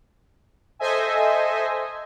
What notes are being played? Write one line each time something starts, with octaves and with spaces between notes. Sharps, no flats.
A4 C5 D#5 E5 G#5